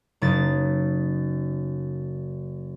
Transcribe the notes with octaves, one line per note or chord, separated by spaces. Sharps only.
F#1 D#4 A6